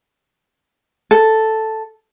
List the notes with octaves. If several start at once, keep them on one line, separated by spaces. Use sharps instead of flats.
A4